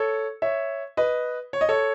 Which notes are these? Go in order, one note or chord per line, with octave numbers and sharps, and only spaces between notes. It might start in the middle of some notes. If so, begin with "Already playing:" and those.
Already playing: A4 C#5
C#5 E5
B4 D#5
C#5
D#5
A4 C#5